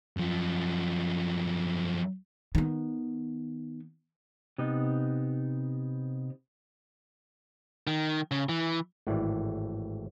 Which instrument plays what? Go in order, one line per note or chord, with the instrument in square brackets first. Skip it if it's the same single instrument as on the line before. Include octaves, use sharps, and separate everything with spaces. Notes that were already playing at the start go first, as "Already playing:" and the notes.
[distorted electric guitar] F#2 F3
[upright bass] D#3 B3
[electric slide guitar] C3 B3 D#4
[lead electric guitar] D#3
C#3
E3
[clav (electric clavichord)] G#1 A2 E3 D5